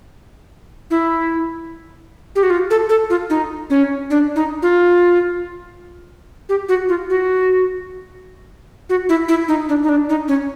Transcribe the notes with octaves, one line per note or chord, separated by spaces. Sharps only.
E4
G4
F#4
F4
A4
A4
F4
D#4
C#4
D4
D#4
F4
G4
F#4
F4
F#4
F#4
E4
E4
D#4
D4
D#4
D4
D#4
C#4